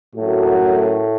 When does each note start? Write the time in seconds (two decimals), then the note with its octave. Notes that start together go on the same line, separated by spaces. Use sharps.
0.15 F#2 A2 F#3 A3 F#4
0.59 A2